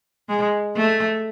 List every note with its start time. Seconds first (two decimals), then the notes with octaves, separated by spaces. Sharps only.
0.29 G#3
0.76 A3